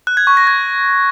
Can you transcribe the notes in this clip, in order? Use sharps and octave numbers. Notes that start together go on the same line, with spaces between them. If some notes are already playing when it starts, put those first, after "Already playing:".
F#6
G#6
C#6
A#6
G#6